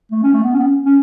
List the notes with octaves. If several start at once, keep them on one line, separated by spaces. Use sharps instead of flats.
A3
C#4
A3
B3
C#4
B3
C#4
C#4